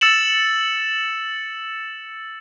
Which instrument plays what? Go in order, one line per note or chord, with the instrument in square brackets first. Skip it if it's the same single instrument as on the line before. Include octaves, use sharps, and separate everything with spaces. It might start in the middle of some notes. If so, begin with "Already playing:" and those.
[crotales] E6 A6 C#7 E7 F#7